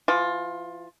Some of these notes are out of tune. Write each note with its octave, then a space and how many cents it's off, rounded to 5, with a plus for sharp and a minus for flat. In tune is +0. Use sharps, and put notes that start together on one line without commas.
E3 +45 F4 +20